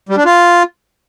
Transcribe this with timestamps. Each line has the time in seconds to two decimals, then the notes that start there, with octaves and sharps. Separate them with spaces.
0.09 G3
0.17 D4
0.25 F4